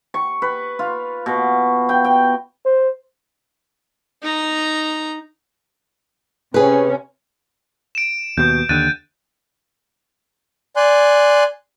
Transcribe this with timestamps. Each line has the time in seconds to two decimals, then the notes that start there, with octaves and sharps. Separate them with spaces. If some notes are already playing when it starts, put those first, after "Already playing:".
0.14 C#6
0.42 B4
0.79 F4
1.26 B2
1.89 G5
2.05 G5
2.66 C5
4.22 D#4 A#5
6.54 C3 C#4 G#4 B4
7.95 D7 E7
8.37 D#2 B2 G6
8.69 D#2 D3 F#6 A6 D#7
10.76 D5 G#5 C6 F#6